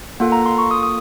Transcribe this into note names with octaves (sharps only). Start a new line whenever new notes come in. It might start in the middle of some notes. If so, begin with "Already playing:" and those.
A#3 F4 A4 F#5
A#5
C6
C#6
D#6
D#6